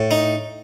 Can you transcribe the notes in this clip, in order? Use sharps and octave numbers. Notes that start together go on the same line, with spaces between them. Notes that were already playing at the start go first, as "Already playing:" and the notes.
Already playing: A2
D#4